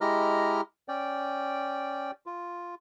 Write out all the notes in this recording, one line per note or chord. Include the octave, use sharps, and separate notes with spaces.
G#3 E4 G4 D#5 A#5 F6
C#4 D5 G5
F4